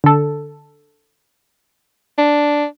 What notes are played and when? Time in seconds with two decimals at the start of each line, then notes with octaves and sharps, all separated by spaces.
0.04 D3 A4
2.18 D4